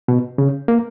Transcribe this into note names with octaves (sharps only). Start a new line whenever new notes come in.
B2
C#3
A#3